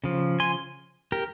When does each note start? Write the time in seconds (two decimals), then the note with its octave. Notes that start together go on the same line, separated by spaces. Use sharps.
0.04 C#3 F3
0.40 G#5 C6
1.12 G4 A#4